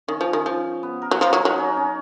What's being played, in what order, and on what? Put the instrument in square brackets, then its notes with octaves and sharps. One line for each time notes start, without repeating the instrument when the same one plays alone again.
[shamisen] D#3 [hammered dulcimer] C#4
[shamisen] F3
D#3
F3
[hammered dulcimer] B3
A#4
[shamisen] F#3
[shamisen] F3 [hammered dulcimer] A#4
[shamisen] F#3
[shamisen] F#3 [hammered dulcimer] D#4
[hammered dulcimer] C#4
C#4